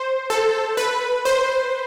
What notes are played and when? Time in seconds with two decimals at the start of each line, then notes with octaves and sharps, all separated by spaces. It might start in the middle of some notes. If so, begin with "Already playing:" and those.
Already playing: C5
0.30 A4
0.77 B4
1.25 C5